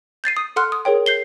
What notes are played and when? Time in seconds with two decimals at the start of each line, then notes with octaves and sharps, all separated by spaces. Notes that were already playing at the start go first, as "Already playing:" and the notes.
0.24 G6 A6 C7 D#7
0.37 D#6
0.56 A4 F#5 C6 F6 F#6
0.72 D#6
0.85 G#4 A#4 C#5 G5
1.06 G6 C7 G7